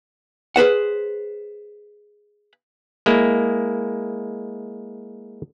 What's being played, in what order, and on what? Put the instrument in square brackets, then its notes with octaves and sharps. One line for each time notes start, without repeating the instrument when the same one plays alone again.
[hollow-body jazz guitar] G#4 B4 C5 F#5
[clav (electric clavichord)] G#3 A#3 E4